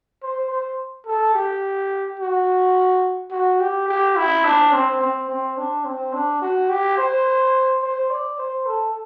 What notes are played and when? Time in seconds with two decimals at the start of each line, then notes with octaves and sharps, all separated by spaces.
0.22 C5
0.50 C5
1.06 A4
1.34 G4
2.20 F#4
3.31 F#4
3.60 G4
3.88 G4
4.16 E4
4.45 D4
4.73 C4
5.01 C4
5.29 C4
5.58 D4
5.85 C4
6.13 D4
6.42 F#4
6.70 G4
6.98 C5
7.82 C5
8.10 D5
8.38 C5
8.66 A4